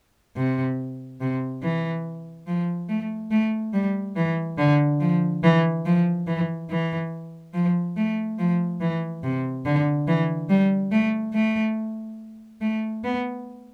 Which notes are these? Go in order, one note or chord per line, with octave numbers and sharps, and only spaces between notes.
C3
C3
E3
F3
A3
A3
G3
E3
D3
F3
E3
F3
E3
E3
F3
A3
F3
E3
C3
D3
E3
G3
A3
A3
A3
B3